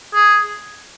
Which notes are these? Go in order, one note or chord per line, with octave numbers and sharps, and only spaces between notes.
G#4